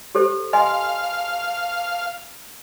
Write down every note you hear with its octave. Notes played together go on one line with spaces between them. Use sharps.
G4 A4 C5
D#5 F5 G#5 C6